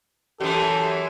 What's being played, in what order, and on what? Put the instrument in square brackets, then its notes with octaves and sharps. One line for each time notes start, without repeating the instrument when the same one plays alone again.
[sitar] F#2 E3 [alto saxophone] G4 [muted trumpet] A4